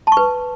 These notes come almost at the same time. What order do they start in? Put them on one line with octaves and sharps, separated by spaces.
A5 C#6 B4